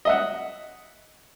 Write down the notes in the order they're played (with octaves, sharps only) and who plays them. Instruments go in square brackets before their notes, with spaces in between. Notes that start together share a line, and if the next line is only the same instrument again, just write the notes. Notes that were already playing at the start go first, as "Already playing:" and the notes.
[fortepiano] D#5 E5 F#5